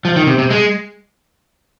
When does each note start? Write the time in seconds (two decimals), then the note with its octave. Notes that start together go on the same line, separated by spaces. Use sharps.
0.05 F3
0.16 D#3
0.27 C3
0.38 C3
0.50 G#3